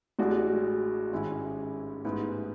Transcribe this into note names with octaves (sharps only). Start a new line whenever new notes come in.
A1 A2 G#3 D4 F#4
G#1 G#2 G#3 C#4 E4
A1 G#2 G#3 B3 E4